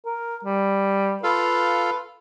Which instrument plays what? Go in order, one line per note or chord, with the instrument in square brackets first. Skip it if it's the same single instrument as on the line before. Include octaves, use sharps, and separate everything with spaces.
[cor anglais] A#4
G3
[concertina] F4 A4 F5 [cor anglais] B4